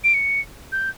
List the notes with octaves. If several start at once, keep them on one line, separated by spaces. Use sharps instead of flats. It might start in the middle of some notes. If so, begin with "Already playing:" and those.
D7
C#7
G6